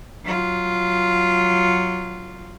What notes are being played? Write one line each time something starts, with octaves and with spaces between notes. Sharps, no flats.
F#3 F4